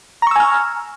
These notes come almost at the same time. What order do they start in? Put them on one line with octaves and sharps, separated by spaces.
A#5 C#6 E6 G#5 F6